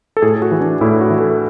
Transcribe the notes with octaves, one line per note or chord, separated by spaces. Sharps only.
A4
A2 G#4
F#4
E3
D4
A2 E4
F#4
E3
A4